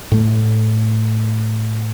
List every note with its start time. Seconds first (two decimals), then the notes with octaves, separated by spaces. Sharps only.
0.12 A2 A3